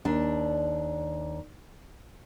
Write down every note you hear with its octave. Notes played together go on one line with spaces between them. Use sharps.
D#2 D4